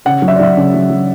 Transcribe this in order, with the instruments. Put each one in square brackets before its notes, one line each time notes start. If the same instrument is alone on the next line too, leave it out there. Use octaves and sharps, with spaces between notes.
[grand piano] C#3 F#5
F#3
E5
D5
F#3 E5
C#3
F#3
F#3